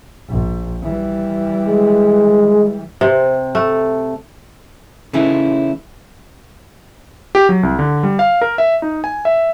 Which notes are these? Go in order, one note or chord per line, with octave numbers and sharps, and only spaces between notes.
A#1
E3 G3
G#3
C3
A3
C#3 E3 A3 C#4 D#4 E4
G4
F#3
C2
D3
G3
F5
A#4
E5
D#4
G#5
E5